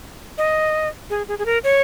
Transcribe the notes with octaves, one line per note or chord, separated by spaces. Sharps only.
D#5
G#4
G#4
G#4
A#4
C#5